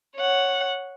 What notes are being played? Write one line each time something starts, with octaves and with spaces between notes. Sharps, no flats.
C#5 F#5